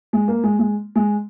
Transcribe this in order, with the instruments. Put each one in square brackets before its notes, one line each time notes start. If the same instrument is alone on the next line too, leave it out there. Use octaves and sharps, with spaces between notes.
[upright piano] G#3
A#3
G#3
G#3
G#3